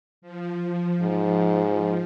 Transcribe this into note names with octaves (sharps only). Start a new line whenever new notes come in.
F3
G#2